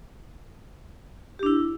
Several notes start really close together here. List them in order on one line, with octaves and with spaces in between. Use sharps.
G4 D4 E4